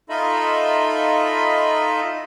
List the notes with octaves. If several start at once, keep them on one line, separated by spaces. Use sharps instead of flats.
D#4 F4 A4 D#5 E5 B5